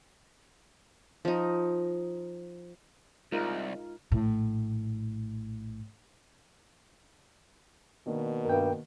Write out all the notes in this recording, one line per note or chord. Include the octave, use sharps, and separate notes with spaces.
F3 D#4
C2 G#3 D#4 F4 A#4
A#1 A2
B2 D#3 A#3 D4
G2 A#4 G5